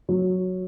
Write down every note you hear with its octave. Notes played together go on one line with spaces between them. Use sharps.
F#3